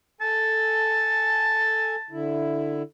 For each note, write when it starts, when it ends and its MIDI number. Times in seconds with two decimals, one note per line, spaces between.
0.21 1.96 69
0.21 1.96 80
0.21 2.20 81
2.11 2.83 50
2.11 2.83 64